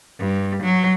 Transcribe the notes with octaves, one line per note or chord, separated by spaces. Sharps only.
G2
F#3